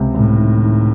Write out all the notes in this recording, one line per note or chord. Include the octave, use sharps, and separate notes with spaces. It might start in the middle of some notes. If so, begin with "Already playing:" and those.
Already playing: C#2 C3
C#2 A2
D#3
D#3